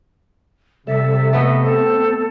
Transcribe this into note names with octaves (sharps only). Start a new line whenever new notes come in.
C3 G3 A4 E5
A3 B3 D#5
C4 A4